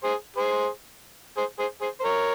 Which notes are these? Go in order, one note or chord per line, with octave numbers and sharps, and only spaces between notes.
G#4 C5
G#4 C5
G#4 C5
G#4 C5
G#4 C5
C5
A#4 C#5